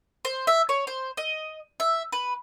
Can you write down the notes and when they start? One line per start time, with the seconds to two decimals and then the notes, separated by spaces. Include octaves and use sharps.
0.25 C5
0.47 E5
0.69 C#5
0.87 C5
1.17 D#5
1.80 E5
2.12 B4